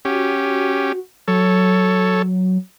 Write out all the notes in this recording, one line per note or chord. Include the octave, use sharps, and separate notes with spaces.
C#4 F#4 G4
F#3 A4 C#5